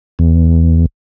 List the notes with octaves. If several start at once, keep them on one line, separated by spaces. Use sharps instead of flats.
E2